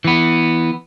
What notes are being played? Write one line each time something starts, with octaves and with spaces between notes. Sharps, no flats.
E3 B3